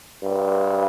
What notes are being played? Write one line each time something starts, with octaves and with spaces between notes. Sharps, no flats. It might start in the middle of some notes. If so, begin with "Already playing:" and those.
G2